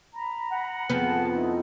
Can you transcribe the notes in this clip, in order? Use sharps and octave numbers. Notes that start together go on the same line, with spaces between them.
A#5 B5
F#5
F2 B3 G#4 A5
D#4 E4